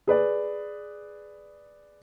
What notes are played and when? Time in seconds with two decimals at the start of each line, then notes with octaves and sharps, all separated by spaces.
0.07 G#4 B4 D5